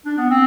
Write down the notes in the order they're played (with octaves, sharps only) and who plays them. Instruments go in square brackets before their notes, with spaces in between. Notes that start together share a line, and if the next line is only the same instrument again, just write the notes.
[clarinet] D4
B3
C4